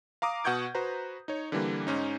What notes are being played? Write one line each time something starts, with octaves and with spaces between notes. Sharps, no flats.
F5 A#5 D6 D#6
B2 F#5 C#6 G6 G#6 D7
F#4 B4 C5 A#5
D#4 C#5
D3 E3 G3 A#3
G#2 C#4 D#4